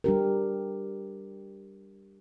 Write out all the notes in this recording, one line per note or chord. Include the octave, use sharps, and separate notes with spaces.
G3 D4 G4 A#4